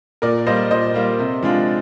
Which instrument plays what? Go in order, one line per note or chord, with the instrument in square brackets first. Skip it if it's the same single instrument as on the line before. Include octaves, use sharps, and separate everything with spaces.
[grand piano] A#2 [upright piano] A#4 D5
[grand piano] G3 A#3 F4 [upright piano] C5 D#5
[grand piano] A#2 [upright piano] C5 D#5
[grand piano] G3 A#3 F4
C3
F3 G#3 D4 F4